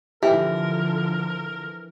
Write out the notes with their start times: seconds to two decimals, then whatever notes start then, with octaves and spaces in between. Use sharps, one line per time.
0.23 D3 E3 F3 G4 A#4